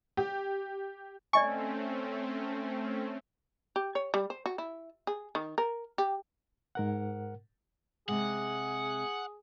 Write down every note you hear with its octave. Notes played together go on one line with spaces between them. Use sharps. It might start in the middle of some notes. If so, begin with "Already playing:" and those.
G4
A3 C4 C#4 D5 D#5 G#5 C#6
G4
C#5
G3
C5
F#4
E4
G#4
D#3
A#4
G4
G#2 A#4 F#5
C3 G#3 G#4 F#5